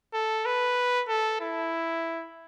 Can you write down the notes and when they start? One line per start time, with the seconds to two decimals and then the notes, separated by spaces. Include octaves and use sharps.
0.14 A4
0.45 B4
1.08 A4
1.41 E4